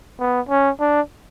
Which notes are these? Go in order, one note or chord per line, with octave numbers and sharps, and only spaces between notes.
B3
C#4
D4